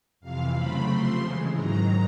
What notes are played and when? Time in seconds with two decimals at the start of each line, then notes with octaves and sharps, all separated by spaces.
0.20 F2 C3 E3 F5
0.54 C#3 F#3 A3 C4 B5
0.87 C3 F3 A3 C4 C6
1.20 C#3 E3 G#3
1.54 G#2 D#3 F#3 A#5